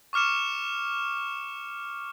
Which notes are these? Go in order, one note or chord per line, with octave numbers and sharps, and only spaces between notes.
C#6 D6 F6 C#7 E7